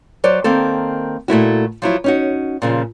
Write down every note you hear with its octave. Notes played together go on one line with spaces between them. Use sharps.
F#3 C5 D5
D#3 A#3 C4 A4
A#2 A3 E4 F#4
F3 F#3 E4
C#4 D#4 F#4
A#2 C#3 F3